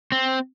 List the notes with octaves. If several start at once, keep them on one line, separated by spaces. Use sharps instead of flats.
C4